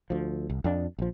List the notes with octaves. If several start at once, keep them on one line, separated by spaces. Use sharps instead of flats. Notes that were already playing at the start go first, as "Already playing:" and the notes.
D2 F3
C2
F2 D4
A#1 F3